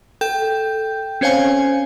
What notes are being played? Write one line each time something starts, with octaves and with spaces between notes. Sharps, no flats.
A4 G5 G6
C4 C#4 C5 C#5 F5 G#5